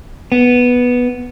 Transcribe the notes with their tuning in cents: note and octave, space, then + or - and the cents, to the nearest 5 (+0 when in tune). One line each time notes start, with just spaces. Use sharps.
B3 -5